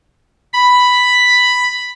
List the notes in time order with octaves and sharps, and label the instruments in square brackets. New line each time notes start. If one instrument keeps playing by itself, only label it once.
[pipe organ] B5